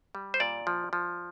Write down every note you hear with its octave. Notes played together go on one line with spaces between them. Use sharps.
G3
C5
A#2 D5
F3
F3